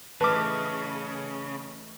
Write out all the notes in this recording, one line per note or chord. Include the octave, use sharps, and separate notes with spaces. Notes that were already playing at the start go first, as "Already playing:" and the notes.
C#3 E3 A3 B4 D#5 A5 D6 F6